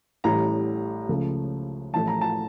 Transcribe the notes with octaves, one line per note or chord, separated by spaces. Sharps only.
A1 A2 E3 G3 A#5
C#2 C#3 F3 A3
A1 A2 F3 A3 A5
A#5
A5